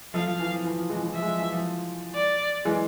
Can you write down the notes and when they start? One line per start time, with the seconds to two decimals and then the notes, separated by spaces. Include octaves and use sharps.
0.14 F3 A3 F5
0.27 F3
0.39 E3
0.52 F3
0.64 E3
0.77 F3
0.89 E3 G#3
1.02 E3
1.14 F3 E5
1.22 G#3
1.27 F3
1.39 E3
1.52 F3
2.15 D5
2.65 E3 G#3